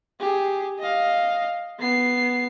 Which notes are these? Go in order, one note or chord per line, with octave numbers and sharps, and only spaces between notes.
G4 G#4
D#5 F5
B3 C7